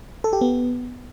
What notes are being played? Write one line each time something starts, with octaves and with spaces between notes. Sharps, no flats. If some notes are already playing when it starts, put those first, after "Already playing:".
A4
G4
B3